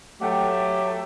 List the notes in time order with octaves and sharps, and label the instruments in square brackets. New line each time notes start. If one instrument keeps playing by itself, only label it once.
[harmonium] F#3 [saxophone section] A3 [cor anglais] G4 [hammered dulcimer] F#5 G5